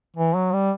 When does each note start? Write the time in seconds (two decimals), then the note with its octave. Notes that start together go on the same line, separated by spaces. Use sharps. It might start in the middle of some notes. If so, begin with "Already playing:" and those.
0.17 E3
0.35 F#3
0.52 G3